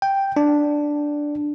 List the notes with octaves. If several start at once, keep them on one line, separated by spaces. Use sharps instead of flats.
G5
D4